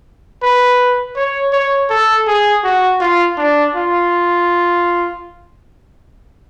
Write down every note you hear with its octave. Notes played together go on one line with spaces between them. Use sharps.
B4
C#5
C#5
A4
G#4
F#4
F4
D4
F4